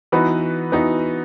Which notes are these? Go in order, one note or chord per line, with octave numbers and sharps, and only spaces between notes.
E3 B3 D#4 F#4 B4
E3 B3 D#4 F#4 B4